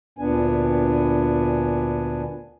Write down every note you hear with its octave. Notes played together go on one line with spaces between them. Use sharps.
D2 A#2 B3 D4 G#5